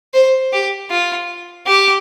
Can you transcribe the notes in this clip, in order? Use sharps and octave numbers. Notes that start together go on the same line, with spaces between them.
C5
G4
F4
G4